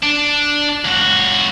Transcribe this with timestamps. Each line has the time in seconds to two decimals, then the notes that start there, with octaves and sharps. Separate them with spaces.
0.03 D4
0.85 C#2 F#4